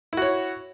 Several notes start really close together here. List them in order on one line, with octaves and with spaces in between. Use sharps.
E4 F#4 C#5